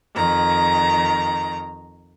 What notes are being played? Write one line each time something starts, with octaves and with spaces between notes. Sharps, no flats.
F2 D#3 A#5